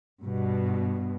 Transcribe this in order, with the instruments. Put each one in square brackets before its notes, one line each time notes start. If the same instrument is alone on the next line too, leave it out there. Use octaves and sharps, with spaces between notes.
[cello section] G2 B2